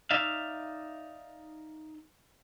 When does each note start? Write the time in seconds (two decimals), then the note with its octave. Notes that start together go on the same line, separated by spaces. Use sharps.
0.11 D#4 D5 E5 F5